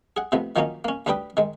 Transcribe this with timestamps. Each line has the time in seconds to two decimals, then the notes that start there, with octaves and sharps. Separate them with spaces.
0.17 G#4 F#5
0.32 C3 F3 A3 B3
0.56 D#3 F3 F#3 A#3 C#4 D#4
0.85 A#3 C#4
1.06 D2 G3 D4 B4 G5 D#6
1.37 D#3 G#3